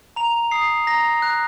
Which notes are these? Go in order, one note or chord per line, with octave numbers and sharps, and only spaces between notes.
A#5 F7
D#6 C7
A#5 A#6
F#6